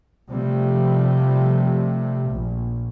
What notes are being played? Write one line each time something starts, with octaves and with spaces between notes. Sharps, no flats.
C3 F3 G3 A3
A#1